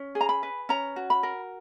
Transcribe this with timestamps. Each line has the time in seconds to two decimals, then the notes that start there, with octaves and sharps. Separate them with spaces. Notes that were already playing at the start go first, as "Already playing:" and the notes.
Already playing: C#4
0.15 G#4
0.21 A#5
0.29 B5
0.43 B4
0.69 C#4 A#5
0.96 F#4
1.10 B5
1.23 A#4